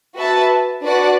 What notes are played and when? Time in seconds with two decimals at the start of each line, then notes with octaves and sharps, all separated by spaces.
0.15 F#4 B4 E5 A5
0.84 D4 F#4 B4 D5 F#5